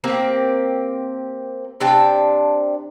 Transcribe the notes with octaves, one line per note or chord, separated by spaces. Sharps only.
A#3 C4 G4
C3 D4 G5 A5